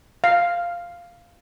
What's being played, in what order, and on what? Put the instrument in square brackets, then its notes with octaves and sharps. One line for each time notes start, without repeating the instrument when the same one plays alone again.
[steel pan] F5